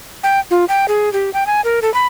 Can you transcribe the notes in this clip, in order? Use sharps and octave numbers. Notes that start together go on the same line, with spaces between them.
G5
F4
G5
G#4
G4
G5
G#5
A#4
A4
B5